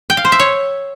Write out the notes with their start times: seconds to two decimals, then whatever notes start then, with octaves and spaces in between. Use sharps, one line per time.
0.10 G5
0.17 F5
0.25 C5
0.32 E5
0.40 C#5